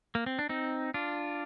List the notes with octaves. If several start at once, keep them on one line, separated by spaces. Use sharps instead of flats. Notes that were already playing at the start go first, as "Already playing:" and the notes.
A#3
C4
D4
C4 D#4
D4 F4